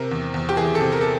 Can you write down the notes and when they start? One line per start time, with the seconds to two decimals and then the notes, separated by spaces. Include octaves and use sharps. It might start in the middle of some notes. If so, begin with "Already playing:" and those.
Already playing: C3 A#4
0.11 E2
0.34 E2
0.49 G4
0.57 E3 G#4
0.75 A4
0.81 C3
0.92 A#4
1.01 A4